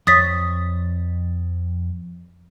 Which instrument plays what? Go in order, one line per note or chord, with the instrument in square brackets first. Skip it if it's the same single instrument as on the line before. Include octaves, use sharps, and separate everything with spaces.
[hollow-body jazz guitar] F2 C#5 [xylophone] D#6 A6 B6